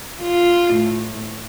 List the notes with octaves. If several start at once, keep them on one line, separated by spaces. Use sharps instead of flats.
F4
A2